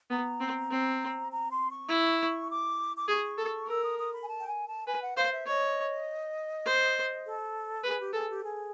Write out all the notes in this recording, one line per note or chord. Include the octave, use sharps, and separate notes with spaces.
B3 A#5
C4
C4
A#5
C6
C#6
E4
D6
D6
G#4 C#6
A4
A#4 E6
D#6
D#6
B5
G#5
A5
G5
G#5
A5
B4 G#5
F#5
C5 F5
E5
C#5 D#5
C5
A4
G#4 B4
G4
G#4 A4
G4
G#4